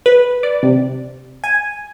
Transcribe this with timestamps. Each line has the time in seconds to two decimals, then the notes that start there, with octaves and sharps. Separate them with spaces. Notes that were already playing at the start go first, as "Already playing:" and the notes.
0.06 B4
0.43 D5
0.63 C3
1.44 G#5